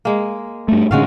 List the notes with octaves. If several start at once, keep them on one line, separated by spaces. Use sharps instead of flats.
G#3 A#3
G2 A3
A2 D3 G#3 C#4 F#4 F5